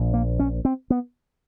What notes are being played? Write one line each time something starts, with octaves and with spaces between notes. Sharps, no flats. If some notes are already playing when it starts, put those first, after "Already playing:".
Already playing: A#1 A#2
A#3
C#4
C4
B3